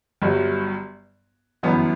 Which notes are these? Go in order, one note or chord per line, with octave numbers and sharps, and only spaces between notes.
G1 G2 F#3
G1 F#2 E3 B3